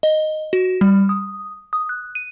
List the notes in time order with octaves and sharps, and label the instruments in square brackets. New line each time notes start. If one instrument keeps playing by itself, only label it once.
[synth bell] D#5
F#4
G3
D#6
D#6
F#6
D#7